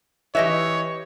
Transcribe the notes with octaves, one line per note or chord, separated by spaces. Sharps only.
E3 G4 C#5 D#5 E5